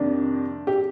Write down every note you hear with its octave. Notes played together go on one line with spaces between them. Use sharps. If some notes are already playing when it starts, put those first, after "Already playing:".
Already playing: F2 C3 D#3 A#3 D4
G4